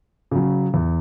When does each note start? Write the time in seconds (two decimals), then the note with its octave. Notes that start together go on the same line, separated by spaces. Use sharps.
0.31 C#3 F#3
0.74 E2